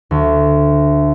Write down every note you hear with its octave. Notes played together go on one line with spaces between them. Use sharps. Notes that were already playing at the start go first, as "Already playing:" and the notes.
D2